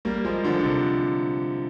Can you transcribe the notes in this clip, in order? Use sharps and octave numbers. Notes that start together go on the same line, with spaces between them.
G3 A#3
F3 G#3
D3 F3
D3
C3